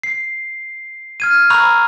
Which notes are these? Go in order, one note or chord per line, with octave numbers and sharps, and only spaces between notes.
C7
F6 G#6 D#7
A#5 B5 C#6 E6 F#6 F7